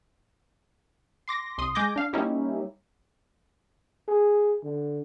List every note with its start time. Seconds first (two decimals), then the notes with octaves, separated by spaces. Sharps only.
1.28 C6 D6 A#6
1.58 C2 C6 D#6
1.75 G#3 G#5 D6 G6 A#6
1.96 D4 F5
2.13 G3 A#3 C#4 D#4 E4 G4
4.08 G#4
4.64 D3